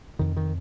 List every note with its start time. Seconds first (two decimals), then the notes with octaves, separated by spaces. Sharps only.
0.19 F2 C3 D#3
0.37 D#3